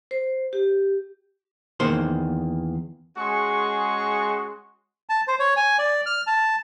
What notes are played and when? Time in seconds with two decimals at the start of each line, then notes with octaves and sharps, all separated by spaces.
0.11 C5
0.53 G4
1.80 E2 D#3 A#3 C5 C6
3.18 G#3 C#4 F#4 G#4 C6 C#6
5.09 A5
5.28 C5
5.39 C#5
5.57 G#5
5.79 D5
6.06 F6
6.27 A5